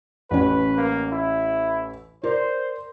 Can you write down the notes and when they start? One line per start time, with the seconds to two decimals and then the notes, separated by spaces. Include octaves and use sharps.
0.31 A1 C#4 B4
0.77 A#3
1.12 E4
2.23 A#4 C5 D5